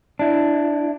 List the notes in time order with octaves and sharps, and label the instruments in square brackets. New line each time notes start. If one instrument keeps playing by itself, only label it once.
[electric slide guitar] D4 E4